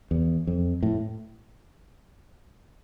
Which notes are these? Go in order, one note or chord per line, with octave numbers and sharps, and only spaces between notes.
E2
F2
A2